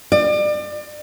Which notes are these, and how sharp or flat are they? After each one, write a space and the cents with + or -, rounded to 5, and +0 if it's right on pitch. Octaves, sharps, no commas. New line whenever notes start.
D5 +35